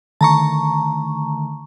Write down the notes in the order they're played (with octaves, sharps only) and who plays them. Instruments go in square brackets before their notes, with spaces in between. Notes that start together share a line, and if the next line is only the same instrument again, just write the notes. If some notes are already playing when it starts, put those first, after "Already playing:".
[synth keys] D3 D#3 A3 [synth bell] A5 A#5 C#6